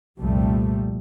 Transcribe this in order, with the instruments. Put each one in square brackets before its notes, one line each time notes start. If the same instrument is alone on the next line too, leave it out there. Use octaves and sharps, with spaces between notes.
[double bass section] C2 F2 A#2 F3 G3 A3